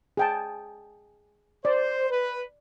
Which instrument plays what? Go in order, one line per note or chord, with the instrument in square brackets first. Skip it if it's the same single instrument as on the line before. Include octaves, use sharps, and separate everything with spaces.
[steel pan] G#4 G5 A5
[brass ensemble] C5 [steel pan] D5
[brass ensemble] B4